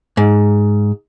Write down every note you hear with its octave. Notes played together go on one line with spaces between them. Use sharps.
G#2